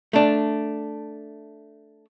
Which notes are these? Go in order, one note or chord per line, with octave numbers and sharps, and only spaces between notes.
A3 D4